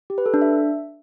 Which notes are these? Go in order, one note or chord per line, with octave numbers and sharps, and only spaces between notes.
G4
B4
A4
D4
E5